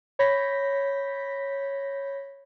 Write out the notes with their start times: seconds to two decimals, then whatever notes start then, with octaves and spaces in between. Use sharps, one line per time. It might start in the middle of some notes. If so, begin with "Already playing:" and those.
0.19 C#5 B5 G6 A#6 B6